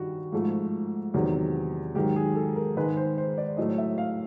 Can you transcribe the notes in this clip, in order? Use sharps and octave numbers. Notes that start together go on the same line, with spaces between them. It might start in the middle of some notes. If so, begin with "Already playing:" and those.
Already playing: G2 D#3 G3 F4 F#4
G#2 F3 A3
E2 C3 D#3 F#3
G#2 D#3 F#3 G4
G#4
A4
A#4
G#2 D#3 G#3 B4
C5
C5
D5
A2 F#3 A3 D#5
E5
F5